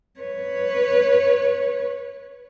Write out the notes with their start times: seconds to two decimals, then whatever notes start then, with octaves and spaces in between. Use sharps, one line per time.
0.20 B4 C#5